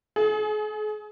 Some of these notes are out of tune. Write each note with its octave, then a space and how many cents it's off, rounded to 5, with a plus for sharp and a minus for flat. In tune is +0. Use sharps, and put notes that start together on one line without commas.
G#4 +35